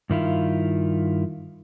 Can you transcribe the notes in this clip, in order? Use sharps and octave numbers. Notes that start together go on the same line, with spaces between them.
G2 D#3 E4 F4